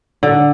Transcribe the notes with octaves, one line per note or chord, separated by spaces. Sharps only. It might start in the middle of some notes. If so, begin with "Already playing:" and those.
D3